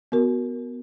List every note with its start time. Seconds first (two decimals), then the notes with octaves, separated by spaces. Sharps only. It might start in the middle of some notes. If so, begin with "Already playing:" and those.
0.12 B3 F#4 A#4